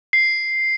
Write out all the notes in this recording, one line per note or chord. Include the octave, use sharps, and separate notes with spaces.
C7